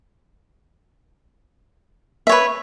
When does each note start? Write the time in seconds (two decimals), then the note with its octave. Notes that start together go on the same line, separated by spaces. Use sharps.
2.27 E5
2.29 C#5
2.32 B4